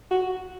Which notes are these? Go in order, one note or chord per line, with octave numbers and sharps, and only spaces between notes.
F#4